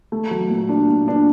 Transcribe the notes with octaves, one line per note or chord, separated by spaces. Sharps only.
A3
F#3
A#2
D4
A#2
D4